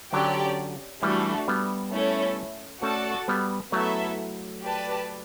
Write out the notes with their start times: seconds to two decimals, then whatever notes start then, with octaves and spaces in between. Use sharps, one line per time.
0.13 D3 F#3 C#4 G4 D5 G5
1.03 E3 G3 A3 D4 F#4
1.48 G3 B3
1.93 A3 C#4 E4 A4
2.82 A3 C#4 F#4 A4 D5 A5
3.28 G3 B3
3.72 F#3 A3 B3 E4 A4 E5
4.63 G4 B4 D5 A5